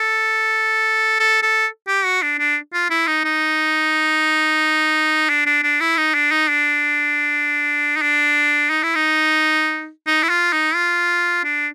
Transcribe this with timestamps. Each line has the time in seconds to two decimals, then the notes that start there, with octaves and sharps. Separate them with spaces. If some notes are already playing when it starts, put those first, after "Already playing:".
Already playing: A4
1.20 A4
1.43 A4
1.88 G4
2.05 F#4
2.22 D4
2.39 D4
2.73 F4
2.90 E4
3.07 D#4
3.25 D#4
5.29 D4
5.46 D4
5.63 D4
5.80 E4
5.97 D#4
6.14 D4
6.31 D#4
6.49 D4
7.97 D#4
8.02 D4
8.70 D#4
8.83 E4
8.95 D#4
10.07 D#4
10.23 E4
10.29 F4
10.53 D#4
10.75 F4
11.44 D4